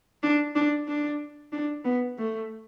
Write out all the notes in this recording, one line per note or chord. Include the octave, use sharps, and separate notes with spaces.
D4
D4
D4
D4
B3
A3